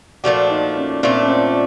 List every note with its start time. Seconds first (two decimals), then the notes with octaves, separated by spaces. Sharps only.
0.24 A#2 F3 A3 D4 F#4
0.50 D#4
0.76 C#4
1.03 A#2 F3 A3 C4 D4
1.22 C#4
1.29 C4